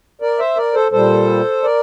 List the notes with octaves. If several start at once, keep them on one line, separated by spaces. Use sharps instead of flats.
A#4 D5
C5 E5
A#4 D5
A4 C5
A#2 G3 A4 C5
A#4 D5